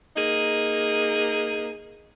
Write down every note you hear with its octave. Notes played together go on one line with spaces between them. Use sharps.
A#3 D#4 G#4